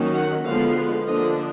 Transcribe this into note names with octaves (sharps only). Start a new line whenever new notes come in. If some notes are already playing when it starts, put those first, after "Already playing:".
Already playing: D#3 F#3 A#3 C#4
F#5
D3 F3 G#3 B3 F5
D3 F3 A#3 D4 D#5